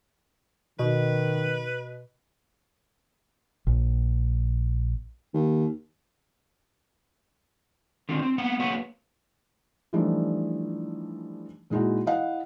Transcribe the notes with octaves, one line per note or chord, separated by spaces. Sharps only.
B2 D#3 B4
A#1
D#2
D3 D#3 C4 F4
C4
A#3 B3 F#5
F#3 A#3 F#4 B4 C#5 F#5
E3 F3 G3 A3 D4 D#4
A#2 G#3 D#4 E4 F#4
E4 D#5 F5 F#5